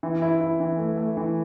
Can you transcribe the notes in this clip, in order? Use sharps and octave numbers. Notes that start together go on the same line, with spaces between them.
E3
E4
E4
E3
A3
A3
E3